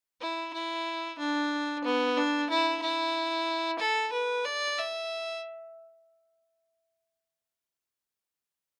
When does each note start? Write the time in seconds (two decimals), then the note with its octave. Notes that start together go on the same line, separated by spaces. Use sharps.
0.21 E4
0.53 E4
1.18 D4
1.84 B3
2.17 D4
2.50 E4
2.82 E4
3.79 A4
4.12 B4
4.45 D5
4.78 E5